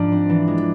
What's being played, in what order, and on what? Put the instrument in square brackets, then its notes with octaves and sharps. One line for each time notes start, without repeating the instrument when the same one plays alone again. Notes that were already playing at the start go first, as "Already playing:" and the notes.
Already playing: [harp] G#2 F3 [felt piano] D4 D5
[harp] C4
E3
G#3